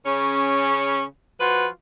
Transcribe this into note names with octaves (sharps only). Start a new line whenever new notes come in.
C#3 C#4
F3 F4 F#4 B4